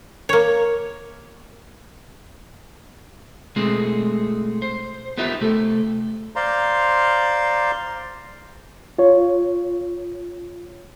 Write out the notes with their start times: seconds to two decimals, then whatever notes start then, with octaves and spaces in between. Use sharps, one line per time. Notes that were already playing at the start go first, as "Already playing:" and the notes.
0.29 A#3 C#5
3.56 B2 G#3 A3 C4 G#4
4.62 C5
5.17 B3 D#4 F4 G4 A#4 E5
5.41 C3 A3 A4
6.36 C5 D5 F5 A#5 C6
8.98 F4 C#5